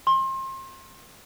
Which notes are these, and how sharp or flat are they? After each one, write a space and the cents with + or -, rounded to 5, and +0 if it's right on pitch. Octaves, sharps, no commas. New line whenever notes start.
C6 +30